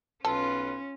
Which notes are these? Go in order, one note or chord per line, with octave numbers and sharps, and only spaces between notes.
B1 C#4 F4 A4 B4